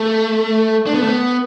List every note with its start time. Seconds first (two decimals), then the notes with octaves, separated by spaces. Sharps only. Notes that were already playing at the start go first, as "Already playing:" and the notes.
Already playing: A3
0.87 D4
0.94 B3
1.01 A3
1.07 B3